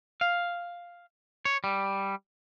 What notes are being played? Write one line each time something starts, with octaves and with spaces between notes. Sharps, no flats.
F5
C#5
G3